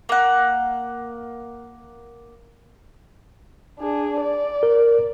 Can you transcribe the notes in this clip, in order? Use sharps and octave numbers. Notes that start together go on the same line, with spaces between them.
A#3 F#5
D4 G#4
D5
A#4